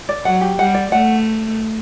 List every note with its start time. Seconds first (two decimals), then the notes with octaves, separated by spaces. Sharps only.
0.09 D5
0.25 F#3 F#5
0.41 G4
0.59 G3 F#5
0.74 D5
0.92 A3 F#5